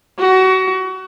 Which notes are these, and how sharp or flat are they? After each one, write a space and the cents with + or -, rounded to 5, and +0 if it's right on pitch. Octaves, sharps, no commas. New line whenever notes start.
F#4 +25